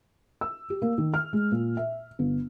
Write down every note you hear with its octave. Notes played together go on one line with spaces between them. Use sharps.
E6
G4
A#3
D#3
F6
G#3
A#2
E5
G1